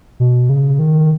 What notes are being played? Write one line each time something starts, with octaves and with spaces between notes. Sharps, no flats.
B2
C#3
D#3